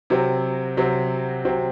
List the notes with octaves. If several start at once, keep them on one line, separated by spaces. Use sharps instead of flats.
C3 F#3 C4
C3 F#3 C4
C3 F#3 C4